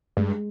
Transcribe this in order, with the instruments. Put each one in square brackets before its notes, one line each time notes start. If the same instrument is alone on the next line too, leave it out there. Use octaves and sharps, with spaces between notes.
[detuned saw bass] G2 [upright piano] G#3